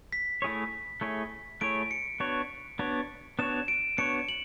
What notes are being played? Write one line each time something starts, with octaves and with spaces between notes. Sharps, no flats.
B6
A3 E4 G#4 C#5
A3 E4 G#4 C#5
A3 E4 G#4 C#5 D7
C#7
B3 D4 F#4 C#5
B3 D4 F#4 C#5
B3 D4 F#4 C#5 E7
D7
B3 D4 F#4 C#5 C#7
F#7